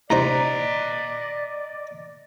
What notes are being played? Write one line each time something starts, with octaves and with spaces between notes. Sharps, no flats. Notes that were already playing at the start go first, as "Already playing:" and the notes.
C2 D#4 C5 D5 D#5 F#5 A#5